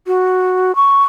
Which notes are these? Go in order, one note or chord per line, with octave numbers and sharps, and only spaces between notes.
F#4
C#6